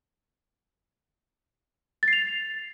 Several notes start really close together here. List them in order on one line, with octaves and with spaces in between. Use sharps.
A6 C7 F7